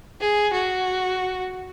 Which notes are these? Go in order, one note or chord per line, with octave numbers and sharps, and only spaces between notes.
G#4
F#4